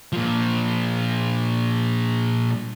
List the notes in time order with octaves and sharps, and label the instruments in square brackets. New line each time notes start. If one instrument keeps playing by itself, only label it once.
[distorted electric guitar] A#2 F3